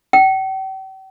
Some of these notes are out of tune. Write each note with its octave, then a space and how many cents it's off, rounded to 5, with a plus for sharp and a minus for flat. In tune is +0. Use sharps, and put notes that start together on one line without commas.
G5 -45